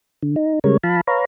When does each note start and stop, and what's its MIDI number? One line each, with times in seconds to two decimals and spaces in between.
0.23 0.36 50
0.36 0.59 63
0.64 0.77 49
0.64 0.77 55
0.64 0.77 56
0.64 0.77 70
0.64 0.77 73
0.83 1.01 53
0.83 1.01 77
0.83 1.01 81
0.83 1.01 83
1.07 1.25 71
1.07 1.25 73
1.07 1.25 77
1.07 1.25 82